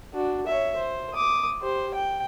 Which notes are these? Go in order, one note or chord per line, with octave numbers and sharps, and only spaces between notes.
D4 F#4
C#5 E5
C5
D6 D#6
G4 C5
G5